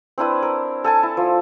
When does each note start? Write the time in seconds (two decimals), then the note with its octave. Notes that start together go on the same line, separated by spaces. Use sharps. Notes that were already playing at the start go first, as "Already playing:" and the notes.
0.18 C4 D4 E4 B4
0.43 A#4
0.84 A4 G#5 A5
1.03 E4
1.17 F3